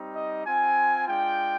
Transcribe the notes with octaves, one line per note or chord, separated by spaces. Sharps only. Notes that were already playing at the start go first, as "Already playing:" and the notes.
Already playing: G3 C4 D#4 G4
D#5
C4 F4 G#5
G#3 D4 F4 G5